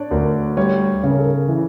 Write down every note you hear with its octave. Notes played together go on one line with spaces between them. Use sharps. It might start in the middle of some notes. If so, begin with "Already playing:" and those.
Already playing: D4 C#5 D5
D2 A#4
G3 C#5
C#3 C#5
A#4
A4
A#4
E3